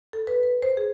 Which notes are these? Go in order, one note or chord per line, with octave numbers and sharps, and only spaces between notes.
A4
B4
B4
C5
G#4